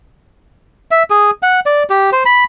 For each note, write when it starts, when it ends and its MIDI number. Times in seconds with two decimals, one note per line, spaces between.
0.91 1.03 76
1.10 1.31 68
1.43 1.60 78
1.66 1.83 74
1.90 2.10 67
2.13 2.23 72
2.25 2.44 83